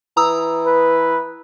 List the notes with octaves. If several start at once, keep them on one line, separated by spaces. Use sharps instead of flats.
E3 A#5 D#6 E6
B4